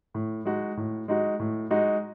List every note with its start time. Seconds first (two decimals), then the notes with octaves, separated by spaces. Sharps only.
0.14 A2
0.45 G#3 D#4 F#4
0.77 A2
1.08 G#3 D#4 F#4
1.39 A2
1.71 G#3 D#4 F#4